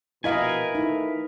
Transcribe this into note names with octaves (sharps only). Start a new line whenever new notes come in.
A#1 B2 E4 A#4 B4 D#5 F5 G#5
E3 A3 D#4 E4